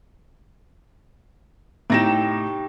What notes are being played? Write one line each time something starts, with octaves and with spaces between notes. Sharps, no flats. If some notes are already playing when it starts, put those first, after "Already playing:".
A2 C3 D#4 G4 A#6 E7